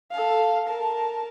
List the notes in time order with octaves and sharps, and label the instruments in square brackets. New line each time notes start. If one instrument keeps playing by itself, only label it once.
[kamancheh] A4 F5
A#4 A5